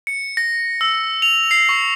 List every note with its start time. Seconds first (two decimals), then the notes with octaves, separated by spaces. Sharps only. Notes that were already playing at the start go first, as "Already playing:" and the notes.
0.07 C#7
0.37 A#6
0.81 E6
1.22 F7
1.51 C7
1.69 C#6